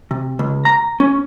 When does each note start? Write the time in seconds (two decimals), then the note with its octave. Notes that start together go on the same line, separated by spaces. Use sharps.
0.11 C3
0.39 C#2
0.65 A#5
1.00 C#4